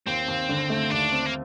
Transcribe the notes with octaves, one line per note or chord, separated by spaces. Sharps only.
D#2 C4
D#2
D3
A3
D#2 D4
C4
A#3